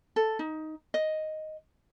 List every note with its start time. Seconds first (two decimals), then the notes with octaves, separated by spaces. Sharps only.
0.16 A4
0.39 D#4
0.94 D#5